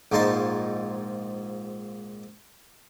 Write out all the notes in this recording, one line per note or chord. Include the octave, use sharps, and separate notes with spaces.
A#1 G#2 F3 D#4 A5 C6